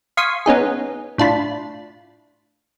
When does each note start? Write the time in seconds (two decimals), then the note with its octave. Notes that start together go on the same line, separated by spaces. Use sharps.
0.17 F5 C6 C#6 D#6 G#6 B6
0.46 B3 C#4 D#4 G#4
1.18 A2 D4 F4 B5